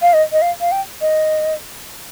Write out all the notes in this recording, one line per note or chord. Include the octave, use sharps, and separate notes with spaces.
F5
D#5
D#5
F5
F5
G5
D#5